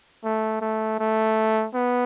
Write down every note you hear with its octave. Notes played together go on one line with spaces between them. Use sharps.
A3
A3
A3
B3